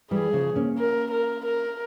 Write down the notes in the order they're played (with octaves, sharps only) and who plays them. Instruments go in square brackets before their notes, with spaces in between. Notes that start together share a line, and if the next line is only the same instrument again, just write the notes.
[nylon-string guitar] E3 G3 [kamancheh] G#4
[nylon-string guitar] C#3 F3
A#3 C#4
[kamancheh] A#4
A#4
A#4